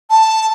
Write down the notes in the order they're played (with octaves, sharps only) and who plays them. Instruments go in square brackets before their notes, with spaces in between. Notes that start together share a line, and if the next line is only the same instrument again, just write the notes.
[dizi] A5